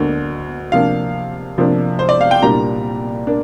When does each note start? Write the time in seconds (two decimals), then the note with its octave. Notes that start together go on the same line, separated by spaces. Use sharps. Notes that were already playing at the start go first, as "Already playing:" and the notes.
Already playing: D2 D3 A#3 D4
0.72 C3 F3 A#3 D4 F5
1.58 C3 F3 A#3 D4
1.99 C5
2.09 D5
2.21 F5
2.31 G5
2.42 C2 A#2 G3 A#3 D4 A#5
3.27 A#3 D4